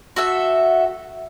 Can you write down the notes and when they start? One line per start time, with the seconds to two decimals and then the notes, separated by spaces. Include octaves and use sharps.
0.16 F#4 A4 E5